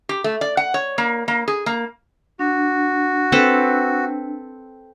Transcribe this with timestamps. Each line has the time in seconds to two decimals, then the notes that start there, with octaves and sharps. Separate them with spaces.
0.09 G4
0.24 A3
0.41 D5
0.57 F#5
0.74 C#5
0.98 A#3
1.28 A#3
1.48 G#4
1.66 A#3
2.39 D4 F#4
3.32 C4 A4 B4